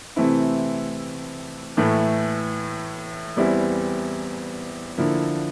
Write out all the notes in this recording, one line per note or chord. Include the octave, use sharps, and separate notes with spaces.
C3 E3 A3 C4 E4
A2 E3 A3 E4
E2 E3 G3 C4 E4
D3 F3 A#3 E4